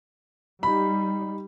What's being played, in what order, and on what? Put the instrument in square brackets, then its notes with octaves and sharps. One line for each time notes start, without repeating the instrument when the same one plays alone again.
[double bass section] G3 [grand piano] D#4 B5